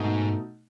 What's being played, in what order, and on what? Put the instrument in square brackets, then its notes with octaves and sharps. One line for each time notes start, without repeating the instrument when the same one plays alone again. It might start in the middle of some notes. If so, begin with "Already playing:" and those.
Already playing: [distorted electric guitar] G#2 [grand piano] B2 A3 D#4 F#4